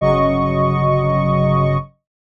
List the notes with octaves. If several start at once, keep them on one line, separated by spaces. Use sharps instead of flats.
G1 C#3 F#3 D#5 C#6